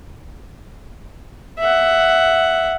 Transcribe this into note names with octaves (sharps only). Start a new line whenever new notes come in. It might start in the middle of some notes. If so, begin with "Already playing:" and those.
E5 F#5